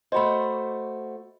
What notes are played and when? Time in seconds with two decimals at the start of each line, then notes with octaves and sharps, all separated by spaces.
0.12 A3 F#4 C5 D#5 B5